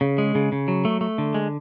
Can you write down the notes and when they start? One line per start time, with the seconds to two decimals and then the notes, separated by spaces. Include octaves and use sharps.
0.01 C#3
0.18 G#3
0.35 C#3
0.52 C#3
0.68 F#3
0.85 A3
1.01 A3
1.18 D3
1.34 G#3